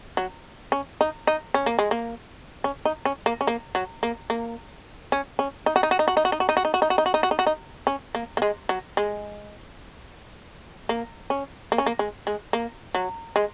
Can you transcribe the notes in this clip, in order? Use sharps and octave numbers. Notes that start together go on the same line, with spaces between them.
F#3
C#4
D#4
D#4
C#4
A#3
G#3
A#3
C#4
D#4
C#4
A#3
C#4
A#3
F#3
A#3
A#3
C#4
C#4
D#4
F#4
D#4
F#4
D#4
F#4
D#4
F#4
D#4
F#4
D#4
F#4
D#4
F#4
D#4
F#4
D#4
F#4
D#4
F#4
D#4
F#4
D#4
C#4
A#3
A#3
G#3
F#3
G#3
A#3
C#4
A#3
C#4
A#3
G#3
G#3
A#3
F#3
G#3